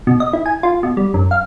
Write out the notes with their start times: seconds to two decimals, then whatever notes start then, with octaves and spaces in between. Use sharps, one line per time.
0.07 B2
0.20 D#5
0.33 E4
0.46 G#5
0.63 F4
0.83 B2
0.97 G3
1.14 F#2
1.31 F5